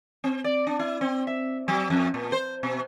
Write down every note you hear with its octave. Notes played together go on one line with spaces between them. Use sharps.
C4
D5
D4
E4
C4
E5
F#3
F2
A#2
C5
B2